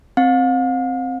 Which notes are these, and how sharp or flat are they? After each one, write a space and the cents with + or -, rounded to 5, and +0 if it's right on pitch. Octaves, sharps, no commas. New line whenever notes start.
C4 +5 F5 +40